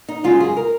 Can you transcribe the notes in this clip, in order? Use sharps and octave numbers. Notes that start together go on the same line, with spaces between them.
D#4
F#2 C#3 G#3 F4
G#4
A#4